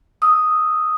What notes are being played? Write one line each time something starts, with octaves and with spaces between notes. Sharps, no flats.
D#6 E6